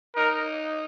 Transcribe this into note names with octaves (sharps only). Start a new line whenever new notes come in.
D#4 A#4